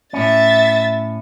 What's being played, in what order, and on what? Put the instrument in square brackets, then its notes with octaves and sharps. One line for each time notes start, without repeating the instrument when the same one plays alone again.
[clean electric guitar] A2 C#4 [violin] E5 A6